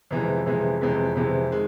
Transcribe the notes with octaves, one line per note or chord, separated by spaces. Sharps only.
F2 C3 E3 G#3
F2 C3 E3 G#3
F2 C3 E3 G#3
F2 C3 E3 G#3
D#3 G#3